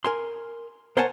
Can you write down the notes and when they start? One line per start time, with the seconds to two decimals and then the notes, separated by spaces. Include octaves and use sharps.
0.04 A#4 G#5 C6
0.97 A#4 C5 C#5 F#5 G#5 A5